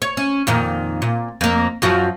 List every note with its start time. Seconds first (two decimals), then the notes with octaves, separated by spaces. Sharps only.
0.02 C#5
0.17 C#4
0.47 F2 A#2 D#3
1.02 A#2
1.41 F2 A#3
1.82 F#2 F3 F#4